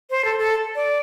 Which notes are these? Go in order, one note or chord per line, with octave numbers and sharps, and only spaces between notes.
C5
A4
A4
D5